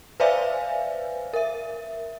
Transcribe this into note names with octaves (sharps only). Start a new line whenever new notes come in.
B4 C5 D5 E5 F5 G#5
A#4 E5